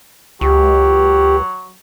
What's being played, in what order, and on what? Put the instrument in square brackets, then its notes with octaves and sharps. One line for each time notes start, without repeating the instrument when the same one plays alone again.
[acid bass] C#2 [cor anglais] F#3 [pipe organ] G4